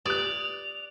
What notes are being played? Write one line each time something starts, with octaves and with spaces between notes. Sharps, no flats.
G4 B4 D5 D#6 F#6 F7